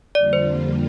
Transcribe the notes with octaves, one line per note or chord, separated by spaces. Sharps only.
F2 D3 G3 A#3 F4 D5
C5